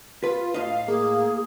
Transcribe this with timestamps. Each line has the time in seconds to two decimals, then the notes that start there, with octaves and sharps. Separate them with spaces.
0.23 F4 B4
0.54 A2 D#5 F5
0.88 A#3 G#4